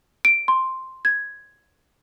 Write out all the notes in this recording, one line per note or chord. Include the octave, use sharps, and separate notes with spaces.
D7
C6
G#6